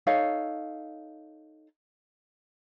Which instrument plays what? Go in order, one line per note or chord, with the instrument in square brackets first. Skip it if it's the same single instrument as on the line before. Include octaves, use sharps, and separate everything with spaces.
[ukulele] D#4 A4 C#5 F5